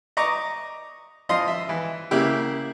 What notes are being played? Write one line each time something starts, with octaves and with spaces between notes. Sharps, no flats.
D#5 A#5 C#6 D6
F3 D#5 F5 C6
E5
E3
C#3 A#3 E4 G4